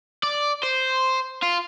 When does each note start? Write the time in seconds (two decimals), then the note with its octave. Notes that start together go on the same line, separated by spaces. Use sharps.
0.23 D5
0.63 C5
1.42 F4